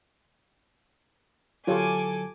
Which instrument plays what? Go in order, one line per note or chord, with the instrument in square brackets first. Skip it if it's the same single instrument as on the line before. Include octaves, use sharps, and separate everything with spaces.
[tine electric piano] D3 F#3 [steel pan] F4 G4 C#5 [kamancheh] A4 [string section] G#5 D6